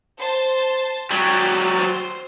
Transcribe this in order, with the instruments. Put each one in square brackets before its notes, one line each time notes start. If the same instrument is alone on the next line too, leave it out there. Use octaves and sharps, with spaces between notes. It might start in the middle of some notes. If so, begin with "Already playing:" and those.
[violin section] C5 A5
[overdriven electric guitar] F#3 G3 [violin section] G5
[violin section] C5